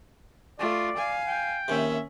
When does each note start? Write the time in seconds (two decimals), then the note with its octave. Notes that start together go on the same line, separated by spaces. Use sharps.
0.59 A3 F4 D5
0.97 F5 G#5
1.27 G5
1.68 D#2 C3 C#4 E5